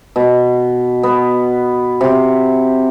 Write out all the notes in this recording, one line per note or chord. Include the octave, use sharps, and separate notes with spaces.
B2
B3
C3